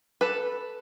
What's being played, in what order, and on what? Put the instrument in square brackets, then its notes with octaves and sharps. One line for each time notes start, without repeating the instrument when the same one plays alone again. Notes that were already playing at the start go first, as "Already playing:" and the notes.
[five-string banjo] A4 B4